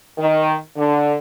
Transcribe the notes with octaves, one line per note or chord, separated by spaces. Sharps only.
D#3
D3